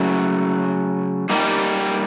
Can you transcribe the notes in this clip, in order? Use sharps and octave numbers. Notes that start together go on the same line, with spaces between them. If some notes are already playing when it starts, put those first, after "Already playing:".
Already playing: C#3 F#3 A3
G3 A#3 D#4 G4